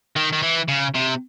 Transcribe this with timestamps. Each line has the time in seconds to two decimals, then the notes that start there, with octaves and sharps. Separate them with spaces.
0.16 D#3
0.33 D#3
0.42 E3
0.68 C#3
0.94 C3